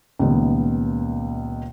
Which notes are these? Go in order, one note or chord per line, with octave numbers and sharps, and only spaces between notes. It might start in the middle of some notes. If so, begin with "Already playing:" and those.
C#2 A#2 D#3 G3 B3